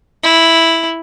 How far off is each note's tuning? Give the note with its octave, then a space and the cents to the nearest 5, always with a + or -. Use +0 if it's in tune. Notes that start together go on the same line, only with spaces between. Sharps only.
E4 -5